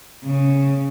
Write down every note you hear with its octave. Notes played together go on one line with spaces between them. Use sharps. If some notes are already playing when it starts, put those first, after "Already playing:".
C#3